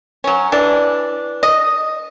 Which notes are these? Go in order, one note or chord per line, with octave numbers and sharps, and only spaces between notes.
F#3 C#4
E3 D4
D#5